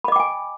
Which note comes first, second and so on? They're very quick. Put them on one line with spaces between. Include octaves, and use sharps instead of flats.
B5 D#5 D6 G5 G#5